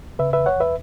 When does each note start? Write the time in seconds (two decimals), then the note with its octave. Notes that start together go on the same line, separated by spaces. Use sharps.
0.19 C#3 B4 E5
0.33 E2 B4 E5
0.46 C#5 F#5
0.56 E2 B4 E5